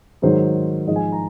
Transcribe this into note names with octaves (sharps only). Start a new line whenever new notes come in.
G#2 D#3 F#3 C5
G#2 F3 D#5
G#5
A#5